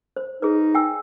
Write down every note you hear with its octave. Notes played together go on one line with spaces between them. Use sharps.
C5
D#4 G#4 B4
G5 G#5 E6